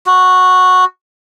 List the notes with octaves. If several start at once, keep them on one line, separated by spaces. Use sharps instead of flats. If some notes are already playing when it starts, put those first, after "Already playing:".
F#4